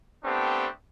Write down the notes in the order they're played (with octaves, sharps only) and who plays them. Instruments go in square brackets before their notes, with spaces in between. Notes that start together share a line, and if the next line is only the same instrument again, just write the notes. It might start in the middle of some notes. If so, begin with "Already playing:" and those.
[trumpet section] A3 B3 C4 D4 G4